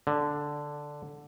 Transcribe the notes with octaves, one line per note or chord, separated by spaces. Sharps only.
D3